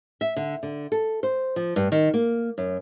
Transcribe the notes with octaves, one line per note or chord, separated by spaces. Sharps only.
E5
D3
D3
A4
C5
F3
G2
D#3
A#3
F#2